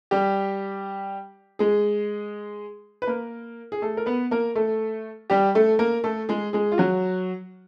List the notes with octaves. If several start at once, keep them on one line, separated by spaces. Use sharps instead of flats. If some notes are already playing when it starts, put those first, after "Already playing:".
G3 G4
G#3 G#4
B4
A#3 A#4
G#4
A3 A4
A#4
B3 B4
A#3 A#4
A3 A4
G3 G4
A3 A4
A#3 A#4
A3 A4
G#3 G#4
G#3 G#4
F4
F#3 F#4